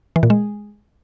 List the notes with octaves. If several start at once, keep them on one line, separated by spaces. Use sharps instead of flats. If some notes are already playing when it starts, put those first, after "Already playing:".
E3
A#2
G#3